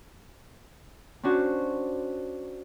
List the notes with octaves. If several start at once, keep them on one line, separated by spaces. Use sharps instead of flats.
C#4 D4 F#4 C5